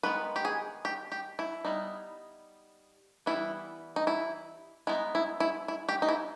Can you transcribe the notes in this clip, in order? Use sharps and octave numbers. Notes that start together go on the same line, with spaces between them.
D#3 G#3 B3 B4
G4
G#4
G4
G4
E4
G3 B3 D#4
E3 G3 B3 E4
D#4
E4
G#3 B3 D#4 E4
E4
E4
E4
G4
D#4
E4